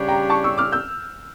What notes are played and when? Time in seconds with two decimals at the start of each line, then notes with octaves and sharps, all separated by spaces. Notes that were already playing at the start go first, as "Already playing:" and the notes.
Already playing: C#3 G3 D4 G4 C#5
0.08 G5 A#5
0.30 A5 C#6
0.44 C#6 E6
0.58 D6 F6
0.72 E6 G6